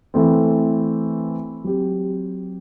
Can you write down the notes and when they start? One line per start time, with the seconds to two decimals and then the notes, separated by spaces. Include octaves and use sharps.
0.14 E3 A3 C4
1.64 F#3 C4 G4